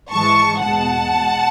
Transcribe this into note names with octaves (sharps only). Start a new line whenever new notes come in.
G#2 E3 G#3 A5 C#6
E2 B2 G#3 F#5 A5
B2 G#3